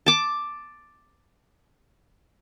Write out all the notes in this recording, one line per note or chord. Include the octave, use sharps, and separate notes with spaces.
A5 D6